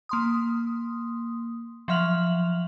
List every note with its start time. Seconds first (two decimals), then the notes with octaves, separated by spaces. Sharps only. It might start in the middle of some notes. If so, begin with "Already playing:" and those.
0.09 A#3 C6 D#6
1.88 F3 F#3 E5 F6 F7 F#7